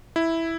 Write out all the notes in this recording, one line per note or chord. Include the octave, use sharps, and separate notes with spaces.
E4